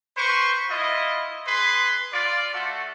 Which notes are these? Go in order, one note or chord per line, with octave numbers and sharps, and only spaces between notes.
B4 C5 C#6
E4 F4 D#5
G#4 B4 C6
F4 D5
A3 F#4 A4